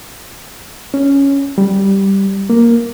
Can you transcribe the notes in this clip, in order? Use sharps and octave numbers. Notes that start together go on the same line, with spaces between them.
C#4
G3
A#3